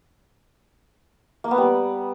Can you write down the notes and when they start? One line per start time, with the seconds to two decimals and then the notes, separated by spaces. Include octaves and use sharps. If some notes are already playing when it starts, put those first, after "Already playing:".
1.44 A#3
1.51 B3
1.58 G3